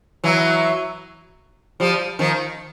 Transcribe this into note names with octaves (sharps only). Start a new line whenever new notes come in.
E3 F#3
F3 G3
D#3 F3